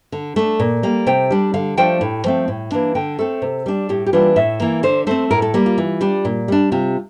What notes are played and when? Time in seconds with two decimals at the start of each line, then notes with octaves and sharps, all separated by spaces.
0.12 D3
0.36 A3 D4
0.59 A#2
0.83 G3 A#3
1.07 C3 G5
1.31 G3 D4
1.54 D3 F5
1.77 F3 A3 D4 G5
2.01 A2
2.24 F3 A3 C4
2.48 A2
2.71 E3 A#3 D4
2.95 D3 G5
3.19 A3 C4 A4
3.42 C3
3.66 G3 D4
3.89 A2 G4
4.06 G4
4.13 E3 G3 A#3 D4 F4
4.36 A2 E5
4.60 E3 A#3
4.83 D3 C5
5.07 A3 C4 C5
5.31 A2 A#4
5.42 A4
5.54 G3 A#3
5.66 F4
5.78 E3
6.01 G3 D4
6.25 A#2
6.48 G3 D4
6.72 C3 F4